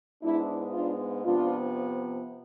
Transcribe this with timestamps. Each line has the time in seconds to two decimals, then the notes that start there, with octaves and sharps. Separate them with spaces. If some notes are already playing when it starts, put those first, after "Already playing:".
0.23 G#2 G#3 B3 D4 E4
0.73 D4 F4
1.24 C3 F3 B3 D4 F4